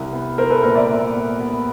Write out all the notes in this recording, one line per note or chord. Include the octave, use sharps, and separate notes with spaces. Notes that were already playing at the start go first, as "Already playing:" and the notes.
Already playing: C2
B3
B3 A#4 C5
A4 B4
A#2 A#4 C5
D5 E5
A#2
B3
B3